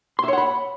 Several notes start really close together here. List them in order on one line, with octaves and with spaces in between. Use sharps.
C6 E5 C#5 F#5 B5